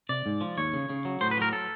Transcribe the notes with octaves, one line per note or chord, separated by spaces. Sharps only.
C3 D5
G#2
F3
D#2 C#5
C#3
C#3
F#3
A2 C5
B4
F#3 A#4
A4